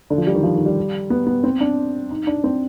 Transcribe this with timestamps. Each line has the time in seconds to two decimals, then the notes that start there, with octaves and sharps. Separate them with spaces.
0.10 D3
0.18 F3
0.27 G3
0.35 D#3
0.43 F3
0.55 D#3
0.66 G3
1.10 B3
1.27 B3
1.44 C4
1.61 D4
2.11 D#4
2.27 D4
2.44 C4